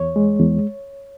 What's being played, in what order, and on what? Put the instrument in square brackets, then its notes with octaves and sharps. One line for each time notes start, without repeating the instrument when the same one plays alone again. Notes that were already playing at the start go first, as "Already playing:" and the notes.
Already playing: [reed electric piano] E2 C#5
G#3
E2